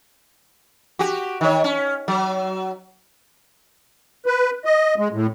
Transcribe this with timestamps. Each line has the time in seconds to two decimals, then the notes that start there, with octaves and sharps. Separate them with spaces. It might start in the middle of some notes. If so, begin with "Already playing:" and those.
0.99 F#4 G4
1.41 D#3 C#5
1.64 C#4
2.08 F#3
4.26 B4
4.65 D#5
4.98 G#3
5.13 A2